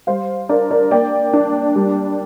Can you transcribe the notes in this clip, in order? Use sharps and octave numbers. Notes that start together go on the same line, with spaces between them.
G3 C5 F5
D4 A#4 D5
A#4 D5
A#3 D5 G5
D4
G3